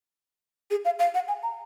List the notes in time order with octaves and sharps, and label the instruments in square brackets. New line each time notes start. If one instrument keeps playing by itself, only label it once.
[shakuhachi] G#4
F5
F5
F#5
G#5
A#5